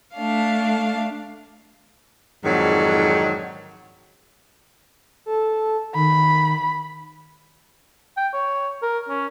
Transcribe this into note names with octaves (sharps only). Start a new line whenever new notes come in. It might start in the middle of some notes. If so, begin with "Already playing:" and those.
A3 D4 F5
F2 G#2 D3 D#3 F#3
A4
D#3 B5
G5
C#5
A#4
C#4